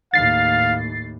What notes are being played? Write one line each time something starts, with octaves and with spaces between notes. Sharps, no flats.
D#2 A2 F5 A6 C7